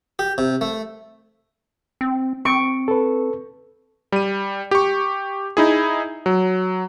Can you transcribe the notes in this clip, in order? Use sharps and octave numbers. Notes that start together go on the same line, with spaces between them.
G4
C3
A3
C4
C4 C#6 D7
A4 B4
G3 D#7
G4 C#6
D#4 E4 G#4
F#3